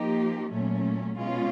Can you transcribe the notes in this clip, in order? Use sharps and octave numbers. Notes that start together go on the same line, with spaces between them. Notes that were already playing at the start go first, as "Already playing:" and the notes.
Already playing: F3 A#3 D#4 G4
A#2 F#3 A3 C#4
B2 G#3 C#4 F4